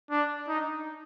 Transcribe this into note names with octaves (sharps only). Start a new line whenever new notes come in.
D4
D#4